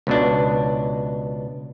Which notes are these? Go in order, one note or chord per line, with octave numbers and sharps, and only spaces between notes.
C#2 B2 D4